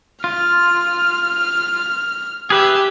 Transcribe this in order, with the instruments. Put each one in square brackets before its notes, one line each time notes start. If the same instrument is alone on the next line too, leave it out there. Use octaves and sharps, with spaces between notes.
[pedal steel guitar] F4 [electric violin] F6
[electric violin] G4 [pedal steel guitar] G#4 B4 E5